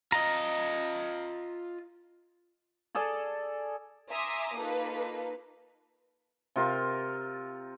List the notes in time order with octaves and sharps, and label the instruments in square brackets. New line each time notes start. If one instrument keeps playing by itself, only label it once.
[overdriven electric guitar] F4 D#5 [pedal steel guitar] A#5
[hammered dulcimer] G#4 A4 D5 A5
[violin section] E5 G#5 A#5 C6 D6 D#6
A#3 D#4 F4 A4 B4
[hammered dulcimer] C3 F4 A#4